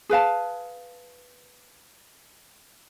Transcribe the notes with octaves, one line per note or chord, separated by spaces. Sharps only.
G#4 B4 F5 A5